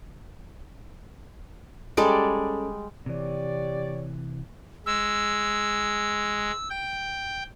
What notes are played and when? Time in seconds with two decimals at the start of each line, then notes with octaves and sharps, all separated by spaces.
1.97 G3 G#3 C#4 G4 A4 D5
3.06 C3 E3 G4 C#5 D5
4.86 G#3 E6
6.70 G5